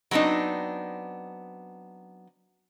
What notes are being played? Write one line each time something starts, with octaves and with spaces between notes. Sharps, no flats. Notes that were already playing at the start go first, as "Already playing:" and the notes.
F#3 B3 C4 D4 D#4